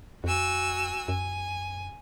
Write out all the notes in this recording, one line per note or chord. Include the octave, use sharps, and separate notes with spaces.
F2 F#4 G#5 E6
F#2 G#5